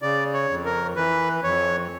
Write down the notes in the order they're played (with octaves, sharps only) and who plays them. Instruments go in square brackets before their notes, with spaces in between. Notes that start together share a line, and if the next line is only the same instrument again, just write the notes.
[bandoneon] C#3 D5
C#5
F2
A#4
E3 B4
F2 C#5